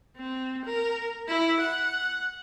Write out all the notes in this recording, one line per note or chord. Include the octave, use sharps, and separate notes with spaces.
C4
A#4
E4
F#5